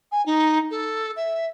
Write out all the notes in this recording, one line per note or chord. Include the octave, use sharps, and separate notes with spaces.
G#5
D#4
A4
E5